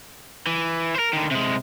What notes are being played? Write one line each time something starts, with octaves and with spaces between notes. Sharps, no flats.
E3
A#4 C5
D3 D#3
C3 G#3